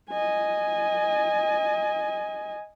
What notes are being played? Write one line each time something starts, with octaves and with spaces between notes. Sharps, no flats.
D#5 G#5